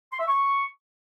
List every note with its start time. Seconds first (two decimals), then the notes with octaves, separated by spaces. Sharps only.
0.12 C6
0.20 E5
0.27 C#6